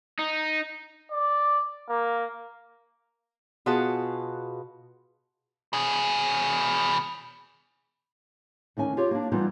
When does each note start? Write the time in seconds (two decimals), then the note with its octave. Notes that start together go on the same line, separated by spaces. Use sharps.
0.19 D#4
1.12 D5
1.89 A#3
3.66 B2 F4 F#4 G#4 B4 A5
5.73 B2 G#4
8.77 D2 D#3 C#4 G#5
8.97 F4 G4 C#5
9.11 A#3 D4
9.32 E3 G3 B3 D#4 F4